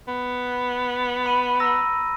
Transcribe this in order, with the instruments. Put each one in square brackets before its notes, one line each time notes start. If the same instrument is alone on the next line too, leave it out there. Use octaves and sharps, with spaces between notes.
[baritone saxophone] B3
[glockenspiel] B5 D#7
A#5 E6 A#6